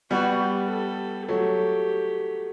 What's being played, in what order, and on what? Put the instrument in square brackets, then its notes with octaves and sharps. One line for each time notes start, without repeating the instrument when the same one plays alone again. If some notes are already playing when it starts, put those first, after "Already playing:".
[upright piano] G3 B3 [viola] F#4
[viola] G4
A4
[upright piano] F#3 A3 [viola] G4